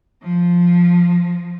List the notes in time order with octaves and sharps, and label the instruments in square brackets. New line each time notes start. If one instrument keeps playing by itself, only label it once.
[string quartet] F3